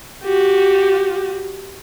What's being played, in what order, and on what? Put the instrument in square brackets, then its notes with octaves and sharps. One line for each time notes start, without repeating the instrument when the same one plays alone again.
[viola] F#4 G4